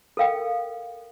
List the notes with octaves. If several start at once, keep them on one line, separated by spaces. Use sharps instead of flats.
A4 A#4 F5 G5